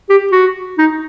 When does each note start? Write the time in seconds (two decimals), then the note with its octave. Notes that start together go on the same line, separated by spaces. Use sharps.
0.10 G4
0.32 F#4
0.78 D#4